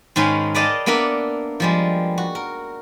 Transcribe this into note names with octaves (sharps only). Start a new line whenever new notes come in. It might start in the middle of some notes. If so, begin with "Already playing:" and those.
G#2 D#3 G#3 C#4 B4 F5
B4 D5 D#5 F5 G5 A5
A#3 B3 D4 A#4 E5 F#5
F3 G3 G#3
F#4
A#4